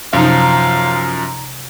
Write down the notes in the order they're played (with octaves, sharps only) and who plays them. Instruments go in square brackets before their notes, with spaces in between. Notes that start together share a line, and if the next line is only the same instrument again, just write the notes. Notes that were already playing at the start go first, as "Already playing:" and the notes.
[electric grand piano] F#2 F3 [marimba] C3 [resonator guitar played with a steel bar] D#4 A#5 [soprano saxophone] F5